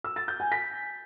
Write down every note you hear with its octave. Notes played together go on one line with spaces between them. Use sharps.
E6
A6
G6
G#5
B6